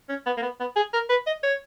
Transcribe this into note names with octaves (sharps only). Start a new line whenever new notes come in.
C#4
B3
A#3
B3
B3
G#4
A#4
B4
D#5
C#5